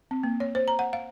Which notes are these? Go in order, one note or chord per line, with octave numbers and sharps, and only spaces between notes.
C4
A#3
C#5
C5
A#5
F#5
F5